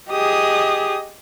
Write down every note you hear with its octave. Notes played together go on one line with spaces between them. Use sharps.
G4 G#4 D#5 D#6